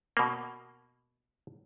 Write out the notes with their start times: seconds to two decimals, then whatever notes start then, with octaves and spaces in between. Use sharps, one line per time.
0.17 B2 A#3